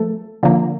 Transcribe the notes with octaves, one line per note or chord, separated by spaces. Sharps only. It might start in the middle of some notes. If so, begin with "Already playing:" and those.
Already playing: F3 A3 A4
D3 F3 A#3